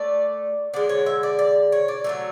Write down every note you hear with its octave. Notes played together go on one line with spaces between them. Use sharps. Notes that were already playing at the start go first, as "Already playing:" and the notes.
Already playing: A3 D5
D3 G#3 D5
C#5
E5
D5
D5
C#5
D5
D3 F#3 A3